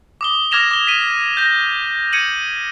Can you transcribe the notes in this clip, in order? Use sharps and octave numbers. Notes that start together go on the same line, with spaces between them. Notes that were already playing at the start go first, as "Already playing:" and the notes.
D6 D#6 G7
D6 F6 G#6 A#6 E7 F7
D6 G7
B6 D#7
G6 A#6
G#6 C#7 D#7 F#7